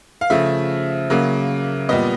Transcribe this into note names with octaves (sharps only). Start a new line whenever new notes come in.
F5
C#3 F3 A3 E5
C#3 F#3 A#3
A#2 G3 B3 D#5